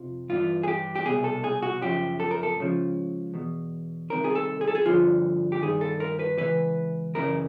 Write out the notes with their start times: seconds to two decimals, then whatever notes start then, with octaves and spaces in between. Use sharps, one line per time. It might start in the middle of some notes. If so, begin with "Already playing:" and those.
Already playing: F2 C3 F3
0.29 G2 E3 F4
0.63 G#4
0.68 G4
0.96 G4
1.06 C2 B2 G#4
1.24 A4
1.44 G#4
1.62 F#4
1.81 F#2 C#3 F3 G4
2.20 A4
2.31 A#4
2.43 A4
2.58 C#2 C#3 F3
3.34 E2 B2
4.10 C2 C3 D#3 A#4
4.24 G#4
4.35 A4
4.61 G#4
4.68 A4
4.75 G#4
4.86 G2 D3 F3 F4
5.52 G4
5.62 G2 D#3 G#4
5.81 A4
6.00 A#4
6.19 B4
6.38 C#2 C3 E3 B4
7.14 F#2 C#3 E3 A#4